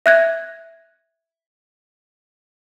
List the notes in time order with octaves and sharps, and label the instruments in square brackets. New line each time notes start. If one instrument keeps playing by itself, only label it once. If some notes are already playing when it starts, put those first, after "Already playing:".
[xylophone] E5 F#6 G#6